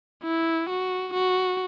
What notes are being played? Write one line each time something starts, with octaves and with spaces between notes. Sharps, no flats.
E4
F#4
F#4